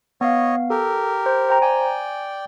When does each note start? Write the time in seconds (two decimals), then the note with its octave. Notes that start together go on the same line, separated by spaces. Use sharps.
0.21 B3 C#5 D#5 F5
0.70 G4 A4 A#4
1.26 C5
1.49 C5 G5 A#5
1.62 D5 G5 G#5